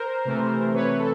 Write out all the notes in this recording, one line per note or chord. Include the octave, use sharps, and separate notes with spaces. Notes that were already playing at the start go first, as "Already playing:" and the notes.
Already playing: A#4 C5
C3 E3 A3
C3 E3 A3 B4 C#5
A4